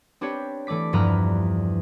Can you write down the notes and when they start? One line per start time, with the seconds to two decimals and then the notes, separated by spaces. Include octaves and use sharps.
0.21 C4 D4 G4 B4 C#5
0.67 E3 A3 D5 D6 B6
0.93 E2 G2 F3 B4 A#5 F6